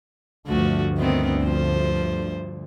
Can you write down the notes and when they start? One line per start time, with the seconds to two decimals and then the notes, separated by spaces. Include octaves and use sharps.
0.47 D2 G2 F3 A3 F#4
0.97 D#3 B3 C4
1.40 F3 C5